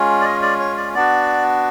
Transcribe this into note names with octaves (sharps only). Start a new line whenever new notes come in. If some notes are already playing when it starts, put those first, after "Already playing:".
Already playing: G#3 C#4 F4
D5
D#5
D5
C#5
D5
B3 D4 F#4 D5